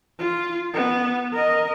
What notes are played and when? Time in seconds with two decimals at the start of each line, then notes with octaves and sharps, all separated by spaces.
0.19 F4
0.74 B3
1.33 A#4 D#5